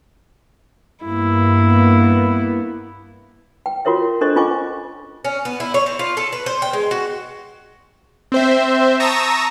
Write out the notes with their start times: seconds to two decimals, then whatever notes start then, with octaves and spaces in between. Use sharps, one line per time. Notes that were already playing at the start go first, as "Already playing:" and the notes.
1.05 G2 A#3 B3 E4
3.66 G5
3.85 F4 F#4 A#4 C#5 E5
4.21 D4 A4 C5 D#5 C#6
4.36 C#4 F4 D#5 G#5 C#6 D6
5.25 C#4
5.45 B3
5.60 E4
5.74 C#5
5.86 C4
5.99 F4
6.17 A4
6.32 B4
6.46 C5
6.62 G5
6.73 G#3
6.91 F#4
8.32 C4 C5 E5
9.00 A5 A#5 C#6 D#6 E6 A#6